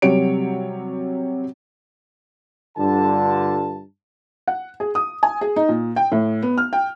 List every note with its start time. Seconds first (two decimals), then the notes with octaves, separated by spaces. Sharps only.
0.02 C3 F#3 G3 C#5 D7
2.78 G2 D3 F4 A5
4.48 F#5
4.80 G#4
4.95 D#6
5.23 G#5
5.41 G#4
5.56 D#4
5.69 A#2
5.96 G5
6.12 A2
6.42 B3
6.58 F6
6.73 G5